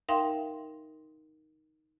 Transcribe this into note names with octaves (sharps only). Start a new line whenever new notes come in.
D#4 A#4 E5 F5 G5 C6